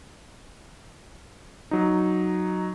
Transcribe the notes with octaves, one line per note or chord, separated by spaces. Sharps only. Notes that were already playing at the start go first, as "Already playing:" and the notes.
F#3 D#4